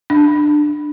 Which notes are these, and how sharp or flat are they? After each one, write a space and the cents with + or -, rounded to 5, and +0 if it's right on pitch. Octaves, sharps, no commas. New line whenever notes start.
D4 +20